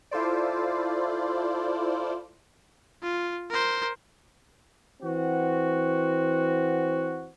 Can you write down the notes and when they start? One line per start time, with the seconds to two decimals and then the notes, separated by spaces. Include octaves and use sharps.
0.11 E4 F4 A4 C5 D5
3.02 F4
3.50 A#4 C5
5.02 E3 C4 F#4